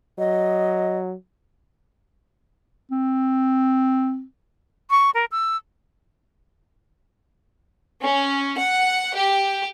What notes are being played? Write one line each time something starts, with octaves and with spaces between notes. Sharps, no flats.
F#3 D#5
C4
C#6
A#4
E6
C#4
F#5
G4